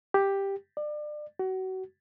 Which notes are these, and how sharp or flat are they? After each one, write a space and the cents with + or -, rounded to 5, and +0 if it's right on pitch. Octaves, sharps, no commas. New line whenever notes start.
G4 +5
D5 +30
F#4 +30